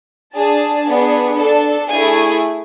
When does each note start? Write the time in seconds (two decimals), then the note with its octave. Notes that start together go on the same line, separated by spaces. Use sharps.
0.34 D4 G#4 A5
0.86 B3 D4 G#4
1.37 D4 A4 A5
1.89 A3 E4 G#4 G#5